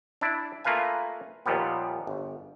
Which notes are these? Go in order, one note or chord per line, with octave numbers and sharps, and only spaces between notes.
D4 E4 D5
A3 A#3 F4 B4 F5 G#5
D#2 A#2 F3 G3 B3
G1